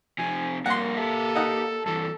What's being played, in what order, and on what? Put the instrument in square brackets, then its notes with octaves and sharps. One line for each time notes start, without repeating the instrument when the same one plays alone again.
[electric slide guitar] C3 F3 C4 [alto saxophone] G#5
[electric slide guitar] G2 G3 A#4 [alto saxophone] A#3 [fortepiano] F#5 C6
[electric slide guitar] G4 E5 [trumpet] A4
[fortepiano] D#4 F#5 D#6
[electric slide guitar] G2 E3 [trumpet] A4